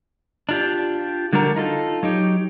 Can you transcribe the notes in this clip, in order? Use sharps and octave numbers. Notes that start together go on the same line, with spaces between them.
D4 F4 G4
D3 G3 D4 F#4 A#4
D#4 F4 A4
F#3 D#4 G4